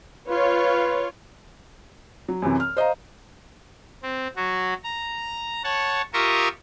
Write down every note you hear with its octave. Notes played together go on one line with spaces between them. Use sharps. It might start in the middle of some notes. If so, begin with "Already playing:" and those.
F4 B4 C#5
F#3
F#2 C3 E3
F6
C5 D#5 F5 A#5
C4
F#3 F#4
A#5
C#5 F#5 A5
F4 G4 A#4 E5 C#6 D#6